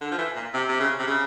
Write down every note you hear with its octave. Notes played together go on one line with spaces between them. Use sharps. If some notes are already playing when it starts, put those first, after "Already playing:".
D3
F3
E3
A#2
C3
C3
C#3
C3
C#3